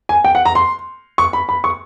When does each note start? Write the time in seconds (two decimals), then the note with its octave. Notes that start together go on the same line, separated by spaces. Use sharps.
0.09 G#5
0.25 G5
0.35 F#5
0.45 A#5
0.55 C6
1.18 C#6
1.33 B5
1.49 B5
1.64 C#6